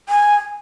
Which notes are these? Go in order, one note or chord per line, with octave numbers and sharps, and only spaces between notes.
G#5